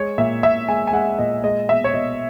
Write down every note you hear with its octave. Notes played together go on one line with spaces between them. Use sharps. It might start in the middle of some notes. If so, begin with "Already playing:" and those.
Already playing: G#3 C#5
A#2 E5
A#2 E5
G#3 G#5
G#5
G#3 F#5
A#2 D#5
G#3 D#5
B2 E5
C#5
B2 D#5